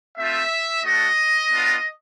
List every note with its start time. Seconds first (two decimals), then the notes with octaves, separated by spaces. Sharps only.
0.17 A3 C4 F4 E5
0.83 A3 D4 F#4 D#5
1.51 B3 D4 F4